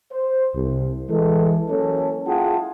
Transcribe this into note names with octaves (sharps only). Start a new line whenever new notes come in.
C5
C2
E3 G#3 A4
F#3 A#3 C#4 A4
E4 F4 G#4 F#5 G5 A5